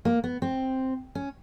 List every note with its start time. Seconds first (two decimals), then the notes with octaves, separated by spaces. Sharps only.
0.05 A#3
0.24 B3
0.42 C4
1.15 C#4